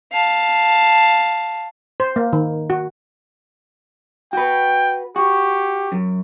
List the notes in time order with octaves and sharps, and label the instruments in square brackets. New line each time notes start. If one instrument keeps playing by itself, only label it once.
[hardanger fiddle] F5 A5
[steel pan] C5
A#3
D#3
F#4
[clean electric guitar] F#4 B4 [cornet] G5
[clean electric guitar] F#4 [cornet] G4
[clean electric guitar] F#2